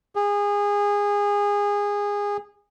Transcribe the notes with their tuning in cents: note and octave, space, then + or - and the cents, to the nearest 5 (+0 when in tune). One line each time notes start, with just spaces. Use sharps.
G#4 -25